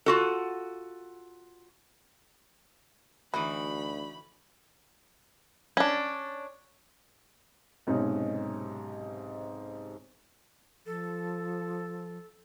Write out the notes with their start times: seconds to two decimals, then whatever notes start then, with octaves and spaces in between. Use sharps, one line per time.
0.06 F4 F#4 A4
3.34 D2 E3 D#4 E4 F#4 B5
5.77 C#4 D4
7.87 B1 G#2 C3 C#4 D#4
10.86 F3 A4